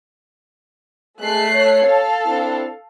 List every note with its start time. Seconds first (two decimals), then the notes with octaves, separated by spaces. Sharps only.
1.19 G#3 A3 F#6 C7
1.52 C#5
1.84 A4 F5
2.25 C4 D4 E4